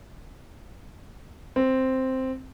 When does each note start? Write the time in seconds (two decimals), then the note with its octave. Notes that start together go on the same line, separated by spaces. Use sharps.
1.56 C4